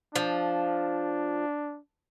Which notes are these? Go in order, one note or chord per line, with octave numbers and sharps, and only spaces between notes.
F3 D4